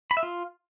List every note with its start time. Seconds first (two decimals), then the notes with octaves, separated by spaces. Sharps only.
0.11 B5
0.17 E5
0.23 F4